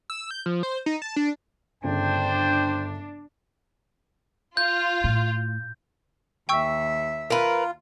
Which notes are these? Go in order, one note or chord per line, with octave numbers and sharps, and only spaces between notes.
E6
G6
F3
C5
D#4
A5
D4
G1 C#3 D4 C5 G5
F4 G6
A2
D#2 E5 G5 C#6 E6
F4 A#4 B4